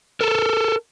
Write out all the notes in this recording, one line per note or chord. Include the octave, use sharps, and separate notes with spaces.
A4 A#4